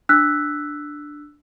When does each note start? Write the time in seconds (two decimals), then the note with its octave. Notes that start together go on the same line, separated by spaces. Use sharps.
0.09 D4 E6 F#6 B6